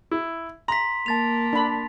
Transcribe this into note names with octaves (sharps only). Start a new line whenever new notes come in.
E4
A#5 C6 B6
A#3 A5 A6 F7
D4 B5